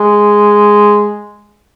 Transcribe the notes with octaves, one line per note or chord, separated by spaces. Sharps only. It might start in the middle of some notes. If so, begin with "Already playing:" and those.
Already playing: G#3